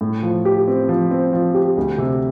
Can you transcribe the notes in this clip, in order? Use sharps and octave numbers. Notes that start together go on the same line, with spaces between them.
A2
F3
G4
C4
F3
C4
F3
G4
D2
C3